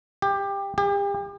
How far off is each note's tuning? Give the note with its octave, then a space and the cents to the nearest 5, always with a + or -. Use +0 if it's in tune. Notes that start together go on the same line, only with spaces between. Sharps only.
G4 +20
G4 +40